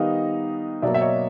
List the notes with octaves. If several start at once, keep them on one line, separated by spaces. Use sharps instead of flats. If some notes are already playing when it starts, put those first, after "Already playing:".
Already playing: D#3 G3 B3 D#4 D#5 F5
B2 F#3 A#3 D5 E5
E5
C#5 D#5